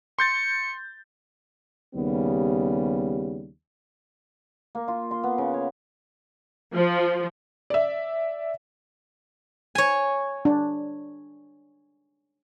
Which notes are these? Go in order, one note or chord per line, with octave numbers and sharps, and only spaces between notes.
C6 G6 A6 C#7
D#2 C#3 G3 B3
A#3
F4
C6
B3
C#3
C#5
F3
D5 E5
C#5 G#5
D4